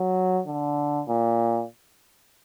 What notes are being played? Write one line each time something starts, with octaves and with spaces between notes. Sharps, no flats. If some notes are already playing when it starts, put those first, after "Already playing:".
Already playing: F#3
D3
A#2